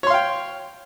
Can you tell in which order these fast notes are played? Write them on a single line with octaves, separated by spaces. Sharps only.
C#5 C6 F5 G5